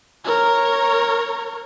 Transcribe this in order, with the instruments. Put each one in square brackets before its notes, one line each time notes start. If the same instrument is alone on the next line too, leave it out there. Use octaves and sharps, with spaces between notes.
[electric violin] A#4 C#5